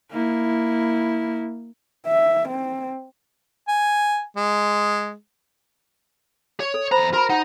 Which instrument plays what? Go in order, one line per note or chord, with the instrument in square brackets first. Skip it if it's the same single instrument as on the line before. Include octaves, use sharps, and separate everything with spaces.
[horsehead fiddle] A#3 E4
E5
C4
[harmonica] G#5
G#3
[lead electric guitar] C#5
[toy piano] A4
[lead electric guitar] E2 A#5 [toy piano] C5 B5
[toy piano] F#4 A#5 B5 [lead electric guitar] A#4
[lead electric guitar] D#4 [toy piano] F#5